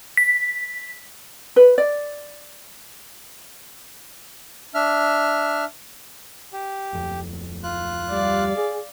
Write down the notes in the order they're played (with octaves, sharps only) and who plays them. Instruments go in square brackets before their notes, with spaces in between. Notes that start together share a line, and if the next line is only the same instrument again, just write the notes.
[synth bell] B6
[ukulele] B4
D5
[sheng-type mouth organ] D4 E5 F6
G4
[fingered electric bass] D1 F2
[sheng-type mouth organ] F4 F#6
[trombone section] G3 [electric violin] D5 F5
[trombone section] G#4